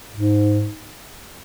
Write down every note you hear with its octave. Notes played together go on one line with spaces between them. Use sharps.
G#2